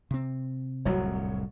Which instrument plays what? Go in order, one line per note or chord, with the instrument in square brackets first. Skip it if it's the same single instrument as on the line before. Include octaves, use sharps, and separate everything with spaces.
[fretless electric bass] C3 C4
[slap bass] D1 C2 F2 [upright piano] F#3 C#5